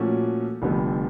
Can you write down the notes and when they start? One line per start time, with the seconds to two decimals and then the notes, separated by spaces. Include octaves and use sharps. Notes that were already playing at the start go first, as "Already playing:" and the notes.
Already playing: A#2 F3 A3 C#4 F#4
0.62 F1 F2 D3 G3 B3